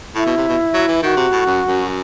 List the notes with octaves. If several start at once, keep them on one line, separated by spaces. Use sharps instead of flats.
A2 E4
B2
C3
B2
F#3
E3
D#3 F#4
C3
A2
F#2
F#2